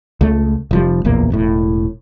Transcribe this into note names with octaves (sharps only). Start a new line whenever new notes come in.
C#2 A3
F1 F3 G3
D1 A#1 E2 A#3
E1 A2